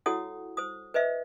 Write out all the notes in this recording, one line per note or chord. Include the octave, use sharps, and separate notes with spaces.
E4 F#4 A4 C#5 F#5 D#6
C5 D#6
B4 C5 D#5 E5